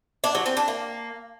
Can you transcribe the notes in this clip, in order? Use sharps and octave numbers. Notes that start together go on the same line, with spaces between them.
D4
F#3
C4
D4
A#3